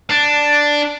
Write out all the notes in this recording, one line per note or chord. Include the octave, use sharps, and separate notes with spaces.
D4